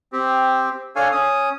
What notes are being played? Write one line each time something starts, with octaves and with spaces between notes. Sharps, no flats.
C4 G4
D4 A4 C#5 F5 G#5
C#4 D#6